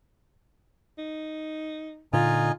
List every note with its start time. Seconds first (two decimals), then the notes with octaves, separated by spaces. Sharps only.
0.98 D#4
2.13 A#2 D3 D#4 F4 D#5 G#5